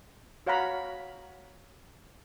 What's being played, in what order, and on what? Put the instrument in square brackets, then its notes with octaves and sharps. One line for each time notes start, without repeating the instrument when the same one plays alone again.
[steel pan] F#4 C#5 F5 F#5 A#5 B5